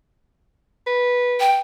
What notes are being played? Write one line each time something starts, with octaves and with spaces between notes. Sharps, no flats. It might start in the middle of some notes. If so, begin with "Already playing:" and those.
B4
G5